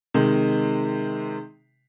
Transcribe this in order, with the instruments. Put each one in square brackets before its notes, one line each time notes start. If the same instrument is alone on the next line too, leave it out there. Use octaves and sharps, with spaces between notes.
[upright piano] C3 D#3 G#3